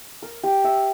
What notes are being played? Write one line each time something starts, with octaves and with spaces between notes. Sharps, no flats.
A#4
G4
E5